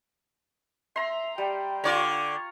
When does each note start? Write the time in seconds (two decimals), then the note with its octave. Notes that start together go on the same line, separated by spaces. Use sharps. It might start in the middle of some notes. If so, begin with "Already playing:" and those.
0.96 E5 A#5 C6
1.38 G3 G5
1.84 D3 F4 C#5 D5 A#5